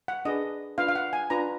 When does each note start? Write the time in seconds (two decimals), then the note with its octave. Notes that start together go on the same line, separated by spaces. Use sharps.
0.08 F#5
0.25 D4 G#4 B4 D#5
0.78 D4 F4 B4 F5
0.88 F5
0.96 F#5
1.13 G#5
1.30 D4 F4 B4 A#5